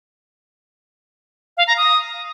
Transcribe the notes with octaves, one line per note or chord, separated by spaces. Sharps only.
F5
A#5
D#6